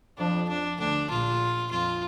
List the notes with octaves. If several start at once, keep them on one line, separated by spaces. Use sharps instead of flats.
F2 F3 D4
D4
D2 D3 D4
A#1 A#2 F4
F2 F4